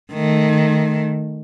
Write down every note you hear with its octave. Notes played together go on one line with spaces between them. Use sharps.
D#3 A3